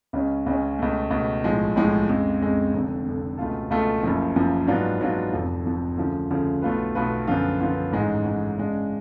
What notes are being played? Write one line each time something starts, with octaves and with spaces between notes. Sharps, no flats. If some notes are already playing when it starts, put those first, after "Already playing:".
C#2 C#3 G#3 C#4
C#2 C#3 G#3 C#4
C#2 B2 A3
C#2 B2 A3
B1 A2 F3 G#3
B1 A2 F3 G#3
F2 C#3 G#3
F2 C#3 G#3
F1 F2 D3
F1 F2 D3
C#2 B2 A3 F4 A4
C#2 B2 A3 F4 A4
F#1 F#2 F3
F#1 F#2 F3
G#2 F#3 B3 D4 F4
G#2 F#3 B3 D4 F4
F1 F2 F3
F1 F2 F3
D2 C#3 F3
D2 C#3 F3
B1 B2 A3 F4 B4
B1 B2 A3 F4 B4
F#2 D3 F3 B3 F4
F#2 D3 F3 B3 F4
A1 G#2 G#3
A1 G#2 G#3
C#3 G#3 D4